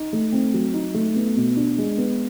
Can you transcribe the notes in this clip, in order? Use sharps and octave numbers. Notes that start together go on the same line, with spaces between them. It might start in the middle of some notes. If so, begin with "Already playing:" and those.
Already playing: D#4
A3
C4
F#3
D#4
A3
B3
B2
D4
G#3
B3